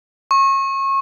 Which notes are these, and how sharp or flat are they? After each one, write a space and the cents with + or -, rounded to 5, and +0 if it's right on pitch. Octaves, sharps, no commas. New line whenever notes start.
C#6 -30